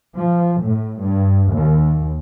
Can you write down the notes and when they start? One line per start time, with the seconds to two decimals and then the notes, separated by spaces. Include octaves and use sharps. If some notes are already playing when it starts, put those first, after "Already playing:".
0.15 F3
0.62 A2
1.00 G2
1.51 D#2